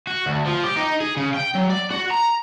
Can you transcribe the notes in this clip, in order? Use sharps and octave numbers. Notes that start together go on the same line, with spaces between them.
F#4
D2
F3
G4
D#4
G#4
C#3
G5
F#3
D5
F#4
A#5